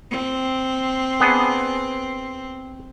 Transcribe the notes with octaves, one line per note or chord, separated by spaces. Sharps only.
C4
B3 D4 G#4